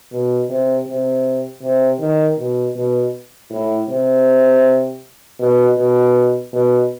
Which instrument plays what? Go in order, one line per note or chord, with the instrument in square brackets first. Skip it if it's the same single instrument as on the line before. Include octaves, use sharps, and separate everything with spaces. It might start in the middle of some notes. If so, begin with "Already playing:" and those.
[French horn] B2
C3
C3
C3
D#3
B2
B2
A2
C3
B2
B2
B2